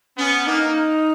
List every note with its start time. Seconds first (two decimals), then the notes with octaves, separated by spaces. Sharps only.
0.17 B3 C#4
0.46 A#3 D#4